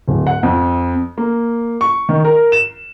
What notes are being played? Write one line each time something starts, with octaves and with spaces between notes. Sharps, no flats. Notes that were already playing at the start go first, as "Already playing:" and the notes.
D1
F#5
F2
A#3
C#6
D#3
A#4
E7